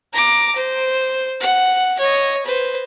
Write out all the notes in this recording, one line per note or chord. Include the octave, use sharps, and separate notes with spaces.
A#5 D6
C5
F#5
C#5 D#5
B4 C5